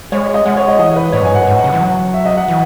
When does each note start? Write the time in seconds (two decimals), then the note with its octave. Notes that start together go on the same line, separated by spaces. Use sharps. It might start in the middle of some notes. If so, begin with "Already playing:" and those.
0.12 G#3 C#5
0.34 D#5
0.45 G#3 F#5
0.57 C#5
0.68 D#5
0.79 E3 D#5
0.96 B4
1.12 A2 C#5
1.21 F#2
1.25 G#5
1.30 G#2
1.35 F#2 F#5
1.47 G#2
1.55 A2
1.64 C#3
1.73 E3
1.81 F#3
2.14 E5
2.26 D#5
2.37 F#5
2.48 E3